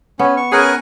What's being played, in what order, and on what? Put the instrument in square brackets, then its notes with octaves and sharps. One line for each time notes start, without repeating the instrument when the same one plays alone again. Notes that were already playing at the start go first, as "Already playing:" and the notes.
[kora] B3 [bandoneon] C#4
[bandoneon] C#6
[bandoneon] C#4 B4 [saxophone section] G#4 [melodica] A#4 F#5 G#5